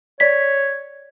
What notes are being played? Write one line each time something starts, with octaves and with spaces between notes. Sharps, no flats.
C#5 D5 B6